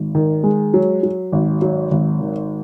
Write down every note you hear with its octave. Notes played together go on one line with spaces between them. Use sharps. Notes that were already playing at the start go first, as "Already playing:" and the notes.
Already playing: G#1
D#3
G#3
F#3
F#3
G#1
F#3
G#1
D#3